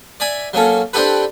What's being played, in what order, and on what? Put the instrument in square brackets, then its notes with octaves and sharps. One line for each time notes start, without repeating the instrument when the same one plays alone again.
[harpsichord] D5 E5 G#5
F#3 A#3 C#4 A4
C4 D4 E4 G4 A4 B4